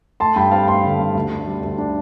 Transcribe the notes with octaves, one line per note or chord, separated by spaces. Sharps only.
A3 A5 C6
G2 G5 B5
C4 F5 A5
A3 A5 C6
D3
G2
D2
D4
G3
D2
D4